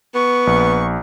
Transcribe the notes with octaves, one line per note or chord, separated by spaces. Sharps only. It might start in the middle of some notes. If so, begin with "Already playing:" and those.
B3 C#6
A#1